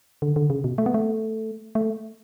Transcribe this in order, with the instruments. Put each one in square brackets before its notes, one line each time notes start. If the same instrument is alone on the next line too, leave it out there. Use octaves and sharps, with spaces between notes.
[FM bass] D3
D3
C#3
B2
A3
B3
A3
A3